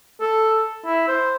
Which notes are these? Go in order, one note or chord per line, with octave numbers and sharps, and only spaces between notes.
A4
E4
C5